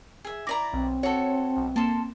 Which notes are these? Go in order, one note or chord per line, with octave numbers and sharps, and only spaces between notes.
G#4 E5
E4 D5 A#5 D6 A#6
B1 C4
F#4 A4 C#5
B1
A#3 A4 A5 C6 E7